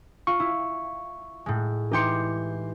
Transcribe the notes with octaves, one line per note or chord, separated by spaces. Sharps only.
F4 C#6
E4
A2 G#3
E3 D#4 G4 C6 C#7